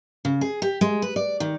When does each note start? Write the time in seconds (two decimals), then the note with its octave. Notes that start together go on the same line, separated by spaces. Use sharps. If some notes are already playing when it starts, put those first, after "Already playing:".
0.25 C#3
0.41 G#4
0.62 G4
0.81 G#3
1.02 B4
1.16 D5
1.40 D#3